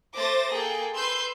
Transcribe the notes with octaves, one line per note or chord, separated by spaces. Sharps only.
A3 C5 D6 A6 A#6
A#3 G#4 A4 G5
B4 C6 E6 G6